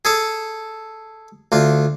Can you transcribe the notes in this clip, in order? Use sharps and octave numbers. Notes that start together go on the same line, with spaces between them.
G#4 A4 A5
D2 F4